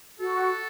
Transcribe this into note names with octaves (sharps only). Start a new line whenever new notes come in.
F#4 A4